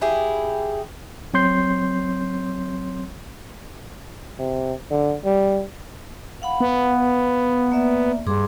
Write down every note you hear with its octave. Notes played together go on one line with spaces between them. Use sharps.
E4 G4 G#4
F#3 C4 C#5 C6 G6 C7
C3
D3
G3
F5 F#5 B5
B3
A#3 D5 E5
G2 G#4 C6 D6